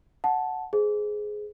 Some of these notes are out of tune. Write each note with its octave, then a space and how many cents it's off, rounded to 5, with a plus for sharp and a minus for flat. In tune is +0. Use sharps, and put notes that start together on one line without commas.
F#5 +0 A5 -10
G#4 +10 C5 -15